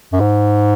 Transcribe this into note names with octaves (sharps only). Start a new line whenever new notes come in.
F#2
G#2